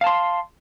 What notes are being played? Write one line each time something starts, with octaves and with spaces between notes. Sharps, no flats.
F5 A5 C6